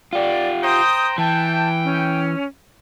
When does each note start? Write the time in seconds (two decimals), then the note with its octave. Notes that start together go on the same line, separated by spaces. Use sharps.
0.13 F4 G4 D5
0.63 C5 G5 A#5 D#6
1.18 E3 G5 A5
1.84 C#4